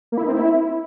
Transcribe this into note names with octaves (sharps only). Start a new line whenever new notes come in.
A#3
E4
D#4
C4
E4